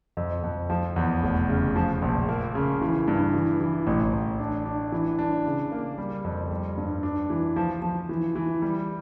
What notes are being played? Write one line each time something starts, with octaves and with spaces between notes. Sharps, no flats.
F2
F2
F3
E2
F1
C#3
F3
A#1
A#3
C#3
E3
G2
E3
E3
A1
A1
D4
D4
E3
D4
C#3
A#3
G3
F2
G3
G2
D4
E3
F3
F3
E3
E3
G3